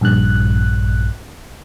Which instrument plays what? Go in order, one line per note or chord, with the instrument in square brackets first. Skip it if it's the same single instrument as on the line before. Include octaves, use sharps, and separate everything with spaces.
[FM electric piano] A#1 G2 F#6